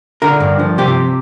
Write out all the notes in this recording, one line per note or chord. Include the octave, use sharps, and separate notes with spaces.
D3 A#4
G2
F3
C3 G4